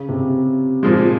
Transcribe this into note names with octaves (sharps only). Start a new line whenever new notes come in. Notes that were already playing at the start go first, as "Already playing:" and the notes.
Already playing: C#3
C3
A#2 F3 G#3